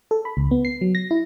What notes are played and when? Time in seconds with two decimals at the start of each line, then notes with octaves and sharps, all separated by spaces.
0.11 A4
0.25 B5
0.37 C#2
0.51 B3
0.65 C7
0.81 F#3
0.95 A#6
1.11 E4